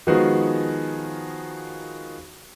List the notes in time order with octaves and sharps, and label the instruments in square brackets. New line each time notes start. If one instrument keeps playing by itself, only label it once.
[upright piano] D#3 F3 G#3 B3 F#4 G#4